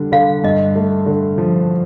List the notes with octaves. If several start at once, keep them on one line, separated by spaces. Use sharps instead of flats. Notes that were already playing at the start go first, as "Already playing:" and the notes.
Already playing: D3 G3 D4
D3 F5
G2 D#5
A3
D3
F3